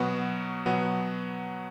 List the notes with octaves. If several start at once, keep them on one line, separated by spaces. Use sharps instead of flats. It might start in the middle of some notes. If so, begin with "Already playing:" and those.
Already playing: B2 F#3 B3 F#4
B2 F#3 B3 F#4